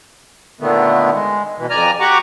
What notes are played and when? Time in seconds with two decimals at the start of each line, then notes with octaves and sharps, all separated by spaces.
0.60 A#2 D3 D#3 A3 B3
1.13 G#3
1.58 B2 E3
1.70 F2 D5 G#5 A#5 F6
2.00 F#4 G4 F#5 A#5 C#6 D6